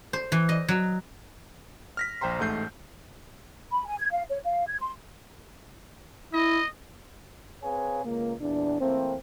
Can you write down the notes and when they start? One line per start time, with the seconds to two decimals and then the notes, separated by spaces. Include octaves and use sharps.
0.13 C5
0.32 E3
0.49 D#5
0.68 F#3
1.97 F6 A#6 B6
2.21 A#1 C5 G5 A#5 C6
2.39 A1 G#2 A3 G6 C7
3.72 B5
3.86 G#5
3.99 G#6
4.12 F5
4.29 C#5
4.45 F5
4.67 G#6
4.80 C6
6.33 E4 D#5
7.63 C4 G#4 B4 C#5 F5 G#5
8.04 C#2 A#3
8.41 E2 A#2 D4
8.80 E3 A3 A#3 C4